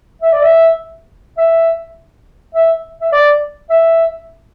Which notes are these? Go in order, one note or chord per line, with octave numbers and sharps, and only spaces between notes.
E5
D5
E5
E5
E5
E5
D5
E5